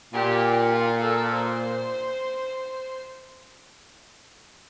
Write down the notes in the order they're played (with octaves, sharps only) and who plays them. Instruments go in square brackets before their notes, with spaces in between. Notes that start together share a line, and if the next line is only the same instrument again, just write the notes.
[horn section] A#2 [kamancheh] G4
[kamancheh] F4
A4
C5